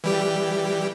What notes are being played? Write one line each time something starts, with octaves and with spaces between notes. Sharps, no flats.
E3 G3 G4